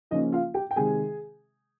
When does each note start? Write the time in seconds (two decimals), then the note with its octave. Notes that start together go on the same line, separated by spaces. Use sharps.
0.11 C#3 F3 A#3 C#4 D#4 D#5
0.32 F4 F5
0.54 G4 G5
0.71 G5
0.76 C3 D#3 G#3 G#4 G#5